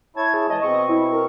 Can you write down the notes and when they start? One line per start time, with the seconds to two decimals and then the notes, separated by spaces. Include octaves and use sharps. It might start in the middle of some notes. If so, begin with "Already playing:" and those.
0.17 E4 C#5 A5 G#6
0.34 G#4
0.50 E3 G#3 D#5 A5
0.62 B2 C4 C#6
0.89 E4
1.13 A#4